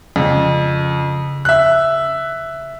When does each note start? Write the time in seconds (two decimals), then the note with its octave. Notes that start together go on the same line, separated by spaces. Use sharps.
0.16 F2 C#3
1.45 E5 F#6